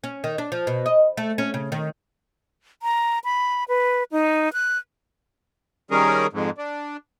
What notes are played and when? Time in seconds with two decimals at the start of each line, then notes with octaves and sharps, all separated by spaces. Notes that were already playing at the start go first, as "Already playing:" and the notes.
0.04 C#4
0.24 D#3
0.38 D4
0.52 F3
0.67 B2
0.86 D#5
1.17 A3
1.38 C#4
1.54 C#3
1.72 D#3
2.83 A#5
3.24 B5
3.69 B4
4.12 D#4
4.53 F#6
5.91 D#3 G3 C#4 G#4 A#4
6.33 F2 G#2
6.58 D4